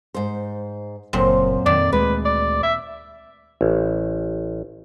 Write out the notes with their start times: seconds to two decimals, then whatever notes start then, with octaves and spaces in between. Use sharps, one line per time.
0.14 G#2 C5
1.13 F#1 F#2 A#2 C4
1.66 F2 D#3 D5
1.92 D2 G#3 B4
2.25 D5
2.63 E5
3.61 A1